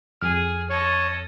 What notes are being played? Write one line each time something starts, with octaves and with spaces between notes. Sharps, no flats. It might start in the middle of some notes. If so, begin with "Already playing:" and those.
F2 G#4 F6
A4 C#5 D#5